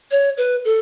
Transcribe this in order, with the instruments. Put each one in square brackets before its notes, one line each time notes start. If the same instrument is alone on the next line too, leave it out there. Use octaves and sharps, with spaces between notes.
[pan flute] C#5
B4
A4